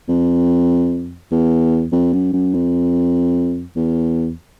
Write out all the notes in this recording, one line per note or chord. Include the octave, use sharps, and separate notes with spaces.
F2
E2
F2
F#2
F#2
F2
E2